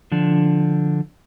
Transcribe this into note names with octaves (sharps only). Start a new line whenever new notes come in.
D3 F3 D4